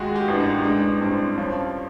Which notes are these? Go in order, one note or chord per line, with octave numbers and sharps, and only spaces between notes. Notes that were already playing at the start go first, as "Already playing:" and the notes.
Already playing: D#2 G#3 F4 F#4
G#4
G4
A1 D4
D#4
G#3 D4
G2 C4
F3 C#4